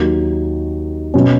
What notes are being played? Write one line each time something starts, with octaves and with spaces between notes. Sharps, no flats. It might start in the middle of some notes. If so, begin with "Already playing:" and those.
Already playing: D#2 D#3 F#3
B2 F#3 C#4